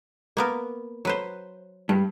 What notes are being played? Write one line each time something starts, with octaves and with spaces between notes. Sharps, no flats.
A#3 B3 A#4
F#3 B4 C5
G2